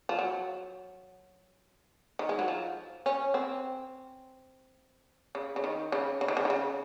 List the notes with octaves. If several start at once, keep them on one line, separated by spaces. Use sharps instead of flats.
F3
F#3
D#3
G#3
F#3
F3
C#4
C4
C#3
C#3
D#3
C#3
C#3
D#3
C#3
D#3
C#3